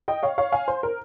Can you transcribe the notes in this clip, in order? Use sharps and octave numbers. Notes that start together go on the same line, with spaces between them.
D#5 G5
C#5 F5
C#5 F5
F5 G#5
C5
A#4